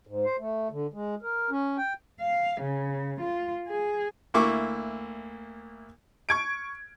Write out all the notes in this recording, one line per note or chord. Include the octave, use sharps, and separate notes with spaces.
G#2
C5
A3
D3
G#3
A#4
C#4
G5
F5
C#3
F4
G#4
D2 A#3 E4 C#6 D6
C#6 G#6 D7